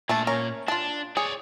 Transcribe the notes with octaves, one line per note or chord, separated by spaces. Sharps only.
A#2 A3 D4 A5
C#4 A#4 C#5
D4 F4 A5
G#4 C#5 D5